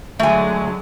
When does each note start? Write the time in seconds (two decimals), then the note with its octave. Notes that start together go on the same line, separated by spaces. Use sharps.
0.19 D3 F#3 G#3 A3 G#5